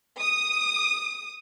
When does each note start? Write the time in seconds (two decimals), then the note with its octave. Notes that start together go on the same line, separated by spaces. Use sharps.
0.20 D#6